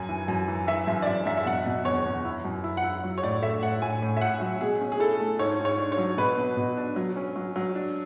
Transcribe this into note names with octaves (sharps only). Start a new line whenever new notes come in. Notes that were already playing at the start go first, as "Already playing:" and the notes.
Already playing: F#2 G#5
E3
F#2
E3
E3 E5
F#2 E5
D5
F#2 E5
F#2 E5
E5
B2 F#5
B2
E2 C#5
E2
E4
F#2
E4
F#5
E4
F#3
C#5
A2 D5
A3 E5
A2 F#5
A2 G#5
A2
E5
A2 F#5
F#3
B2 G#4
C#4
G#4
E4 A4
A3
G#2 C#5
G#2
C#5
D4
C#5
F#3
B2 B4
B2
B2
D4
F#3
C#4
F#3
F#3
D4